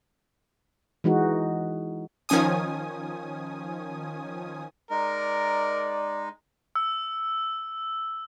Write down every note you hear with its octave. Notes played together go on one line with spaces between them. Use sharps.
E3 G#3 D#4 F#4
D#3 F3 C#4 G#5 D#6
G#3 D#4 A#4 D5
E6